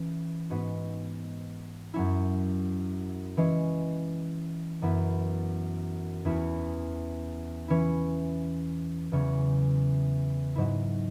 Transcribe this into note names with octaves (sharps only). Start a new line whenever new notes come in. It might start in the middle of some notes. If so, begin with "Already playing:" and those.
Already playing: E3 C#4
G#2 G#3 B3 F#4
F#2 F#3 C#4 E4
E3 G#3 C#4
F#2 E3 B3 E4
E2 E3 C#4 E4
E3 C#4 E4
E2 C#3 F#3 C#4
G#2 F#3 E4